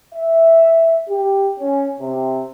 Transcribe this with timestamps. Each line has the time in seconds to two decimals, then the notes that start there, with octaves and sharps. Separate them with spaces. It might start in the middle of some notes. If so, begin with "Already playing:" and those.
0.14 E5
1.09 G4
1.60 C#4
2.00 C3